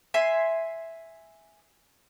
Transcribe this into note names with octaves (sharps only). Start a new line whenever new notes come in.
E5 G#5 C6